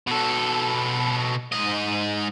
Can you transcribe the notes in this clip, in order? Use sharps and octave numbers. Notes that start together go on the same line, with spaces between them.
B2 A4
G#2 D#5